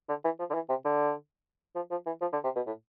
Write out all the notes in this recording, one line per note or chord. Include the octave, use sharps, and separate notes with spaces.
D3
E3
F3
D3
E3
C3
D3
F3
F3
E3
F3
D3
C3
B2
A2